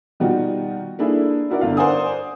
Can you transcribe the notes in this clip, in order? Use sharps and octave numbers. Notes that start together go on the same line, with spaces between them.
B2 D#3 G3 D#4 F4 F#4
A#3 D4 E4 G#4 A4
D4 E4 F#4 A#4 D5
G1 D4 D5 F5
A#4 C5 D5 F#5 G#5 D#6